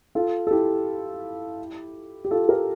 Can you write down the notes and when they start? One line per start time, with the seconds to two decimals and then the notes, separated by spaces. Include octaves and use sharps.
0.15 F4 A4
0.47 A4
0.51 E4 G4
2.25 G4
2.31 F4 A4
2.49 G4 A#4